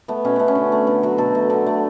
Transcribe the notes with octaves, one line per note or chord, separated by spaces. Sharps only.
A3 B3
B2 C#4
A3 B3
C#4
D3
A3
D3 B4
F#3 A3
B2 A4
A3
D3
A3